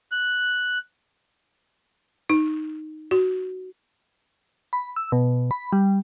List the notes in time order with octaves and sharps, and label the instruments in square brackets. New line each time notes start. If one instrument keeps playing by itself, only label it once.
[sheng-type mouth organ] F#6
[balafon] D#4
F#4
[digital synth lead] B5
E6
B2
B5
G3